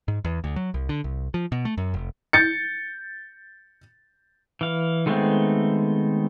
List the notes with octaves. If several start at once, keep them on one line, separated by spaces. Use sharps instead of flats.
G#2
E2
D2
F#3
C2
D3
C2
F3
B2
A3
F#2
F1
G6 A6 C#7
E3 F5
D#3 G#3 A3 B3 C4